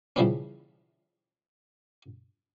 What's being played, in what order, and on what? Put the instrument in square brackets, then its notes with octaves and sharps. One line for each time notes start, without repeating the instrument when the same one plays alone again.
[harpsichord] C#3 E3 F3 G3 B3 C#4